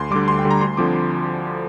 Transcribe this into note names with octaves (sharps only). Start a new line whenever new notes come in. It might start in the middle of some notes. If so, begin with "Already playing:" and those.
Already playing: D2 C6
D3 G3 D6
D2 C6
G5
D3 G3
A#5
D2 C6
D3 F3 C4 D6